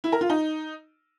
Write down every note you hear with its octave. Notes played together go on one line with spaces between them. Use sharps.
E4
A#4
F4
D#4